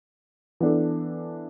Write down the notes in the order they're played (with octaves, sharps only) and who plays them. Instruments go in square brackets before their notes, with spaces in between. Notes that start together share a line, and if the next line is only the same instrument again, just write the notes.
[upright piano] E3 B3 D4 A4